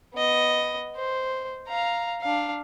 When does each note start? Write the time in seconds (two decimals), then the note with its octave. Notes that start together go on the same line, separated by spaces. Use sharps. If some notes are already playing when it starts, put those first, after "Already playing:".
0.14 B3 D#5
0.96 C5
1.68 F5 A#5
2.22 D4 F5